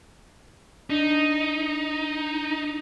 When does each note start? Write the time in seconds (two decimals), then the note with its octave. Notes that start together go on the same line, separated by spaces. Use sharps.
0.90 D4 D#4